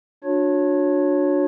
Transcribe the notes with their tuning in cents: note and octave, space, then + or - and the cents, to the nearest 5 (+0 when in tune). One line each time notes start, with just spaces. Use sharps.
D4 +0 F#4 -40 C#5 +0